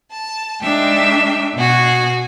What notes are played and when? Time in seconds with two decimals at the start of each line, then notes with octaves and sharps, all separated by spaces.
0.11 A5
0.63 G#3 D4 D#4 E5 G5
1.56 B2 F#4 G#5